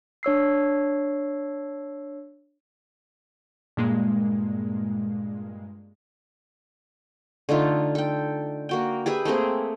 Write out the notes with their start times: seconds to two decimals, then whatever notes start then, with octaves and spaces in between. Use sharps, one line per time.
0.23 D4 C#5 E6 C7
3.77 G2 A#2 G#3 A#3
7.49 D3 A3 D#4 F4
7.95 A4 G5
8.69 A#3 F#4 G5
9.06 G4 G#4 B4 E5
9.25 A3 A#3 C4 G#4